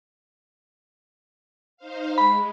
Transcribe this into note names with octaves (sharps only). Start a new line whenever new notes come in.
D#4 C5 F5
G#3 B5